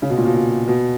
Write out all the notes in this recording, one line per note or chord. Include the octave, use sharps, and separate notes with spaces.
C#3
B2
A#2
B2
A#2
B2